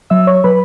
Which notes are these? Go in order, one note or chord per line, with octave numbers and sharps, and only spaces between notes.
F#3 E5 E6
C#5 C#6
F#3 B4 B5